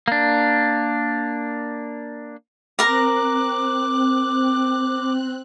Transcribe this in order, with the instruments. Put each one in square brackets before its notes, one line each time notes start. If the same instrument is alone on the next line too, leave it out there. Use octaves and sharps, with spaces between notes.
[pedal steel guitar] A#3 D4
[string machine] C4 F#6 [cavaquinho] A#4 A#5 [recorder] D6